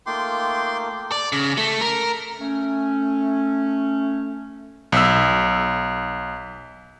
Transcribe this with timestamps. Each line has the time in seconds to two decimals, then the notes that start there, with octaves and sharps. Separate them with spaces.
0.07 A3 A#3 D#4 F4 G5 C6 D6
1.12 D5
1.32 C#3
1.58 A3
1.81 A#4
2.40 A3 C#4
4.92 B1 E6